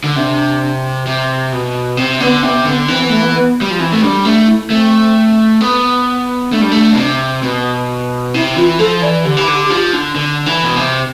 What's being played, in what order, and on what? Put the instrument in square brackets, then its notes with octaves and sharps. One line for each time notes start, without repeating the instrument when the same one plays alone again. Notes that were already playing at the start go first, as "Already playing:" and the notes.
[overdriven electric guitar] D3
[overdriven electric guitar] C3 [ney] D4
[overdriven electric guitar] C3
B2
[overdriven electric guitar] C3 [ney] C4
[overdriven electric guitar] D3 [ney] B3
[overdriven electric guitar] C3 [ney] B3
[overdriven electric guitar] D3 [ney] B3
[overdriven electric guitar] E3 [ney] C4
[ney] B3
A3
B3
B3
[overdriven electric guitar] G3
F3
[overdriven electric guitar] E3 [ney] C4
[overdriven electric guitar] A3
[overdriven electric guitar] G3 [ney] D4
[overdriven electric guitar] A3 [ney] D4
[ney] E4
[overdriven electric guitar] A3 [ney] C4
[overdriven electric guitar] B3
[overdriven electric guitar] A3 [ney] D4
[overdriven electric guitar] G3
A3
B2
C3
B2
[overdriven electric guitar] C3 [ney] E4
[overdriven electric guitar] E3 [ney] F4
[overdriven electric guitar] F3 [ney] A4
[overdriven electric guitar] E3 [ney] D5
[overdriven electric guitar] D3 [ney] G4
[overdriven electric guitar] E3
D3
F3
D3
D3
E3
B2
C3